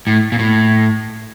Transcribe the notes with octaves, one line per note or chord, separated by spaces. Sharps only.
A2
A#2
A2